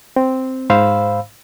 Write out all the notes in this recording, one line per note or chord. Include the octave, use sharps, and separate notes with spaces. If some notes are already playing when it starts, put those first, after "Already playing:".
C4
G#2 C5 F5 B5 E6